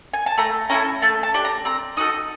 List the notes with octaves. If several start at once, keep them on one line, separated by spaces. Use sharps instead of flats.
G#5
A5
A3 A#5
C#4 E4 A4 A#5
A3 A5
A5
D4 G4
A#5
C4 A#5
D#4 F#4 A4 D#6